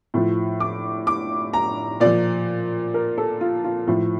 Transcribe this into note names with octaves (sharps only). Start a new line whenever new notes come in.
A2 F3
D6
D6
A#5
A#2 F3 D5
A#4
A4
F4
F4
A2 F3